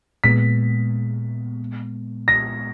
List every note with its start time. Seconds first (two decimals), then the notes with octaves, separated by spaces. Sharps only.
0.24 A#2 G#3 B3 B6
2.28 A#6